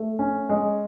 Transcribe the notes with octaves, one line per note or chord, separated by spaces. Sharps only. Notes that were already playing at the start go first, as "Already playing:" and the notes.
Already playing: A3
C#4
G#3